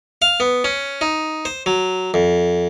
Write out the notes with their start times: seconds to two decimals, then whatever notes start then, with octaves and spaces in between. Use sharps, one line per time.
0.22 F5
0.40 B3
0.64 C#4
1.01 D#4
1.45 C5
1.66 F#3
2.14 F2